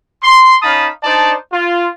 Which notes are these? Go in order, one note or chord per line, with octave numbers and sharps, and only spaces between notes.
C6
C#4 D#4 F5 A5 B5 D#6
D4 D#4 C5 D5 A5
F4